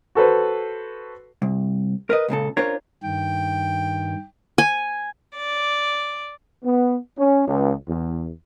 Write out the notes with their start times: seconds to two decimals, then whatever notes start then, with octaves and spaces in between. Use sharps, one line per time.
0.15 F#4 A4 B4 C5
1.42 C2
2.10 A#4 B4 D#5
2.28 C#2 A#2 C#3 A4
2.57 C#4 D4 F4 A#4 C5 C#5
3.03 G2 D#3 G5
4.58 G#5
5.34 D5
6.65 B3
7.19 C#4
7.48 C#2
7.88 E2